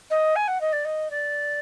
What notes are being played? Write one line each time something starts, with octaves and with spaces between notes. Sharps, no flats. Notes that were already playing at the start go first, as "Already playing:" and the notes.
D#5
G#5
F#5
D#5
D5
D#5
D5